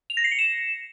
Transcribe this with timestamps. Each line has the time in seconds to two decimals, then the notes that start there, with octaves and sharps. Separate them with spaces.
0.10 F7
0.17 A#6
0.24 C7
0.31 C#7
0.39 E7